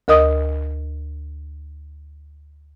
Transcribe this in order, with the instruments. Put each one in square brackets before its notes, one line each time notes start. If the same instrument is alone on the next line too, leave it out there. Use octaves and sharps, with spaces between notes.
[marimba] D2 A#4 D#5 D#6